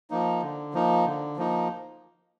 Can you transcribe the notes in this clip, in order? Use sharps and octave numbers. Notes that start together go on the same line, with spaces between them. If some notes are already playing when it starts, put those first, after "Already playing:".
F3 A#3 D#4
D3
F3 A#3 D#4
D3
F3 A#3 D#4